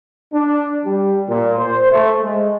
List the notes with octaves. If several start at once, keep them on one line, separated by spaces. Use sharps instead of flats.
D4
G3
A#2
C5
A3
G#3